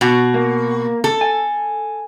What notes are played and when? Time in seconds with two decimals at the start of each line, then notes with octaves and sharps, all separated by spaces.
0.01 B2 F#4
0.34 A#3
1.04 A4
1.21 G#5